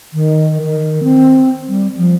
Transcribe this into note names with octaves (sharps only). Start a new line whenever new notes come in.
D#3
D#3
C4
G3
F3